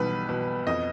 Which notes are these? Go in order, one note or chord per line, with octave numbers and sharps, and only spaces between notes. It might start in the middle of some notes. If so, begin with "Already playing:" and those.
Already playing: B1 B2 G3 B4
B2
F2 D#5